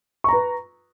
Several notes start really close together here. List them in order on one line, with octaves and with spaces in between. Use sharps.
C#6 A#5 B4